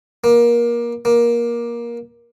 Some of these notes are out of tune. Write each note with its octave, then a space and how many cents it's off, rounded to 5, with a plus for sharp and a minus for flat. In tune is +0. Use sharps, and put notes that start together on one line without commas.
A#3 +25
A#3 +20